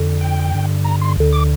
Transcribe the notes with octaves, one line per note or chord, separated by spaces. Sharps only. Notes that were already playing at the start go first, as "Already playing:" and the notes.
Already playing: F2 D3
G5
G2 D3
A#5
C6
D2 D3
D6